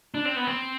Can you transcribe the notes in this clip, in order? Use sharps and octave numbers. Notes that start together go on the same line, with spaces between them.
D4
C4
B3
C4